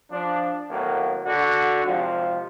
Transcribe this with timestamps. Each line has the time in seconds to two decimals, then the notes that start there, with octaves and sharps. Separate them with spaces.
0.11 F3 D4
0.70 D#2 A2 F#3 A#3 B3
1.25 D3 F#4
1.85 G#1 C3 F3